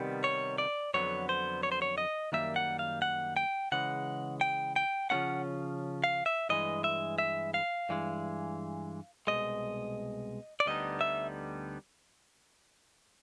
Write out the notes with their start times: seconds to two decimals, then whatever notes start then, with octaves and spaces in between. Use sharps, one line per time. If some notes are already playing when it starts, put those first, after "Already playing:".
Already playing: C3 D#3 G3 B3
0.24 C#5
0.58 D5
0.94 F2 D3 F#3 B3 C#5
1.29 C5
1.63 C#5
1.72 C5
1.82 C#5
1.98 D#5
2.32 F#2 D#3 G3 A#3 E5
2.56 F#5
2.79 F5
3.02 F#5
3.37 G5
3.72 C#3 E3 G#3 F#5
4.41 G5
4.76 G5
5.10 C#3 F3 A3 C#4 F4 F#5
6.04 F5
6.26 E5
6.49 G2 E3 G#3 D#5
6.84 E5
7.18 E5
7.54 F5
7.89 G2 E3 G#3
9.27 C2 B2 G#3 D#5
10.60 D5
10.66 D2 D3 G3 B3 D#4 D#5
11.01 E5